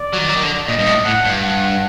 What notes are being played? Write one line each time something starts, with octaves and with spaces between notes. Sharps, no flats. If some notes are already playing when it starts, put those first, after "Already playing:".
Already playing: D5
F#3
D#3
F#3
D#3
D3
A#2 D#5
G2
A2
A2 F#5
G2
F#5